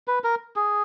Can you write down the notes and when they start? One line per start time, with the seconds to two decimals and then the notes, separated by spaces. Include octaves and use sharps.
0.08 B4
0.24 A#4
0.56 G#4